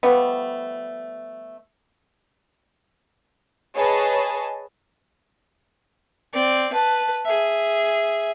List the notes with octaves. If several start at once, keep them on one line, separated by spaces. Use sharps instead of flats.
F3 G3 A3 B3
G#4 B4 C#5 D#5 G#5 A5
C4 D5
B4 A5
G#4 E5